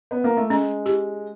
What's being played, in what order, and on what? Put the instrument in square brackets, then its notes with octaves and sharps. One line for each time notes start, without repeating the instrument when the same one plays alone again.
[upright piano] B3
A#3
A3
[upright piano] G#3 [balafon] C#4
[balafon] E4 G4